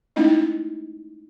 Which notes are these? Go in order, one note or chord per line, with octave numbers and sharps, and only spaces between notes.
G#3 A3 C#4 D#4 E4 D#5